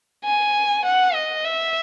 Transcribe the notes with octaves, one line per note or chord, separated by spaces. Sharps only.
G#5
F#5
D#5
E5